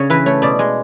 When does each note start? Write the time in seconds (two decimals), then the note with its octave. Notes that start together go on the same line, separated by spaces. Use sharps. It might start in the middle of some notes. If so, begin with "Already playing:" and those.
Already playing: C#3 C#5
0.10 E3 B4
0.26 A3 C#5
0.42 B2 D5
0.59 G#3